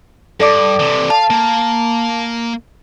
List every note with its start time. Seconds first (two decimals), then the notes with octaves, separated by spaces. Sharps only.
0.40 G2 A4 D5 D6
0.80 C3 E3
1.10 F5 A5
1.30 A#3